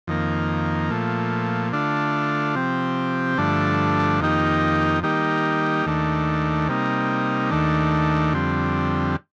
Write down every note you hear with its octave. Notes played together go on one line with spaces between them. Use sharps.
F2 D#3 A#3
A#2 F3 A3
D3 A3 D4 F4
C3 F3 C4 G4
G2 D3 F3 A3 D4
F2 D#3 A#3 D#4 G4
D#3 G3 A#3 D#4 G4
D#2 D#3 A3 D4
C3 G3 A#3 D#4
D#2 D#3 A3 D4
F2 D3 G3 C4